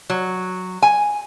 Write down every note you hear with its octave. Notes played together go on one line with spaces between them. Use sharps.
F#3
G#5